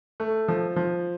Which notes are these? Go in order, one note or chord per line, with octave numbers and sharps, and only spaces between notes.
A3
F3
F3